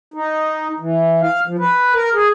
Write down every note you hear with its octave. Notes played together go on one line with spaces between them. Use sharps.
D#4
E3
F5
F3
B4
A#4
G#4